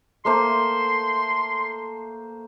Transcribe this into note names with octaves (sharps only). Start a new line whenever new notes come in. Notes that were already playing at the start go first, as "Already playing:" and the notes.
A3 A#3 C5 C6